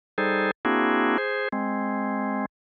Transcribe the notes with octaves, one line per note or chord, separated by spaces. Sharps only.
G3 D#4 G#4 A4 C5
A#3 C4 D4 E4 F#4 G#4
G#4 C5
G#3 C4